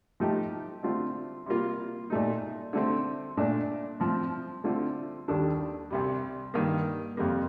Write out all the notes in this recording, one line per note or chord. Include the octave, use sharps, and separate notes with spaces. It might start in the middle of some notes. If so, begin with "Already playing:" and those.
A2 F3 A3 D#4 G4
D3 A3 C4 F4
C3 G3 A#3 F4
A#2 A3 D#4
D3 A3 C4
A#2 A3 D4
A2 F3 C4
D3 A3 C4 F4
D#2 D#3 G3 D4 A4
C2 C3 G3
G2 D#3 A#3
F2 C3 G3 A#3